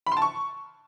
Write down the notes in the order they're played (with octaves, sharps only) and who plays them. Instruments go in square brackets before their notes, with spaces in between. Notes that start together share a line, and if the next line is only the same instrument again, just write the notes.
[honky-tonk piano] B5
C6
A5
C#6